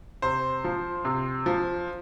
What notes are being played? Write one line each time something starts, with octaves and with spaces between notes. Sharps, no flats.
C3 C5
F3
C3
F3